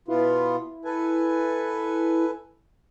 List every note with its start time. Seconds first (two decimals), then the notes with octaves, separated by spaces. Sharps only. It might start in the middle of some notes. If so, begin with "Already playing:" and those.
0.08 B2 B3 E4 F4
0.85 A4 B4 G#5